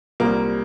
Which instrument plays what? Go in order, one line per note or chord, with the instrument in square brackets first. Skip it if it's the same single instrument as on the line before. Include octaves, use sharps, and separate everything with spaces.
[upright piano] C2 A#2 G3 C4 [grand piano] A#3